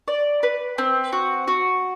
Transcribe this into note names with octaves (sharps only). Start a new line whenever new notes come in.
D5
B4
C4
F#4
F#4